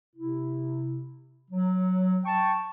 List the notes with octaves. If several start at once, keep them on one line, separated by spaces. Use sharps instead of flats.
C3 E4
F#3
G5 A5 C#6